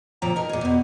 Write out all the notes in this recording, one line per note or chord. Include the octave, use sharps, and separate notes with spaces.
D2 A#2 F3 G5 A#5
D#4 A#4
A#2 G#4
E2 B2